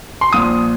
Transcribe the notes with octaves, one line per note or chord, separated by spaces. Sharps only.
C6
A#1 A#2 F3 D#6